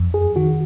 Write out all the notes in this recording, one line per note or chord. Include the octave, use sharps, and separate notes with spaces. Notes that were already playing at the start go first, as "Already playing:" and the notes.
Already playing: F2
G#4
D#3 F#4